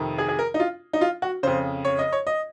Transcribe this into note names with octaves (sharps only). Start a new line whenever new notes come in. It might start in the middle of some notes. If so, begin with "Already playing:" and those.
Already playing: F2 C3 D#3
G#4
G#4
A#4
D#4
F4
D#4
F4
F#4
F2 C#3 C5
C#5
D#5
C#5
D#5